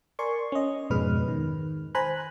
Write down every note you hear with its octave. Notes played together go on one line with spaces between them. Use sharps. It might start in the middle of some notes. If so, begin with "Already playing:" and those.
A#4 D5 G#5 C6 C#6
C#4 D#5
F2 G#2 B2 G#3 B4 F6
D#3
C5 G#5 A#5 B5 F#6